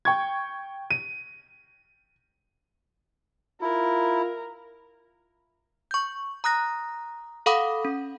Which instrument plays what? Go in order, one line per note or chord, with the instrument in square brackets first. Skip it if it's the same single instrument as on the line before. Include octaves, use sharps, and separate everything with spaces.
[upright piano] G5 C#6 G#6
D#7
[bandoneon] E4 [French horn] F4 [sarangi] A#4
[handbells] C#6 G6
A#5 D#6 F#6 A#6
A4 F5 F#5 B5 D6 D#6
C#4